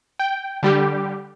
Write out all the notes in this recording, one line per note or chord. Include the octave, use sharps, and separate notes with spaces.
G5
D3 G3 G4